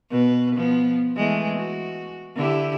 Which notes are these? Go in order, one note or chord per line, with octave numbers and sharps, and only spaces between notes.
B2 B4
F3 B3
E3 G#3 A3
F#4
D3 E4 G4